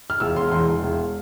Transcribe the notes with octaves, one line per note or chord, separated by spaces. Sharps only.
F6
E1 E6
E1 C6
E2 C6
E1
E1